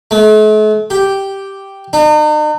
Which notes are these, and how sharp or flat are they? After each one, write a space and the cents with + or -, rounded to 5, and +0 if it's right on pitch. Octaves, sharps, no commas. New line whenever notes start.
A3 -45
G4 -5
D#4 -45